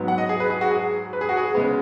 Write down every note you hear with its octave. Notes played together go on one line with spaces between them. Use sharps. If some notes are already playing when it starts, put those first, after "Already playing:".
Already playing: G#2 F#3 B3
F#5
D#5
G#4
B4
G#4
F#4
G#4
B4
G#4
F#4
G#4
C#3 G#3 B3